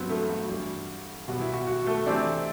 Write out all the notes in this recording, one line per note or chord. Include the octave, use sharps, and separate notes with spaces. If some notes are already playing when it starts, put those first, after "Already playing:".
Already playing: G2 F#3 B3 C4 B4
A3 A4
F#4
G2 E3 G3
B2 G3 B3 F#4
E4
F#4
F#4
A3 A4
C3 E3 A3 C4 D4 D5